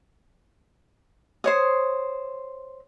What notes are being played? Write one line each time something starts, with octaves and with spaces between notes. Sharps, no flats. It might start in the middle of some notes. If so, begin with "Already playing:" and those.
C5 C#5 D#6